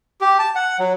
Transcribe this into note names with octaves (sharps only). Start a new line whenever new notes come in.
G4
A5
F#5
F#3